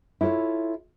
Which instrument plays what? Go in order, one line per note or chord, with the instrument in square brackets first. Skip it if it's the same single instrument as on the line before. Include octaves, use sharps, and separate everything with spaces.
[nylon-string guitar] E4 F4 A4 C#5